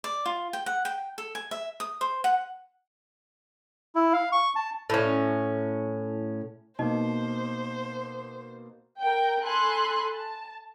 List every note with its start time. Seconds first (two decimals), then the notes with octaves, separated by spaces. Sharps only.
0.04 D5
0.26 F4
0.53 G5
0.66 F#5
0.85 G5
1.18 A4
1.35 G#5
1.51 E5
1.80 D#6
2.01 C5
2.24 F#5
3.95 E4
4.13 F5
4.32 C#6
4.56 A5
4.90 A2 C#4
6.79 B2 A#3 D#4 C5 D#5 A5
9.00 A#4 G5
9.45 A4 G#5 B5 C6 F#6
10.14 A5